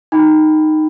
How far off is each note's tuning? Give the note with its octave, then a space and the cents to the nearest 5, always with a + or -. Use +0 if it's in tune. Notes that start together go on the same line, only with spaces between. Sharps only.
D#4 -5 G5 +0 B5 +10